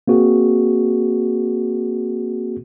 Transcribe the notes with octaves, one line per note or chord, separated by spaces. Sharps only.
A#3 C4 F#4 G#4